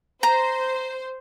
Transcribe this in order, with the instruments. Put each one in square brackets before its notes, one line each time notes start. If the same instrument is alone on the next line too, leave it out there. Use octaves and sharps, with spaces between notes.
[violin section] C5 [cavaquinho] A#5